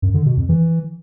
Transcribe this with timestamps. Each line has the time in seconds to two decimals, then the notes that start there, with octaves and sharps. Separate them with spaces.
0.02 F#2
0.14 D3
0.26 B2
0.37 F2
0.49 E3